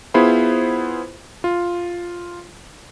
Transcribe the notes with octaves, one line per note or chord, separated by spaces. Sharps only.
B3 E4 F4 G#4 C5 B5
F4